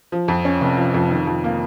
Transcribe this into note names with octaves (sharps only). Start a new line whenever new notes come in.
F3
F2
C#4
F1
F3
F2
D#3
F2
A#3